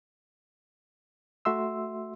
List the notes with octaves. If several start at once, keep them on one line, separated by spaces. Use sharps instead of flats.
A3 F#4 E5 C6 E6